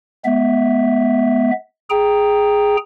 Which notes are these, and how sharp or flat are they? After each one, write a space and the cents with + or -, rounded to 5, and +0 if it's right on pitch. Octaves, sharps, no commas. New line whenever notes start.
G#3 +35 B3 +0 E5 +0
G#4 +0 G5 +0 A#5 +0